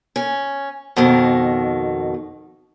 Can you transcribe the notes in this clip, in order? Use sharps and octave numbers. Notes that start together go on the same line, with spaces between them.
C#4
F2 B2 D#3